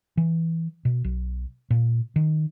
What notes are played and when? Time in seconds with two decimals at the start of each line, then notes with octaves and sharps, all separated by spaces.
0.17 E3
0.85 B2
1.04 B1
1.70 A#2
2.16 D#3